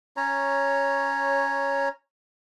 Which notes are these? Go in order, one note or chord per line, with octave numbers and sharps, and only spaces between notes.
C#4 C#5 A#5